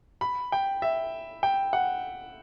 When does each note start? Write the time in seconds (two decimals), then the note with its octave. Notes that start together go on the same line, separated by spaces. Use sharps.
0.21 B5
0.52 G5
0.82 E5
1.43 G5
1.73 F#5